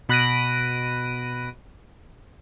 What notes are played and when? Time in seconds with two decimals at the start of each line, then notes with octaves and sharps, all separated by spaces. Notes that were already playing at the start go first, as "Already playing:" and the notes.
0.09 B2 B5 F#6 A#6 D7 D#7